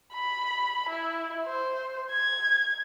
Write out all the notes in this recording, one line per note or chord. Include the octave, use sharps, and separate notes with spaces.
B5
E4
C5
G#6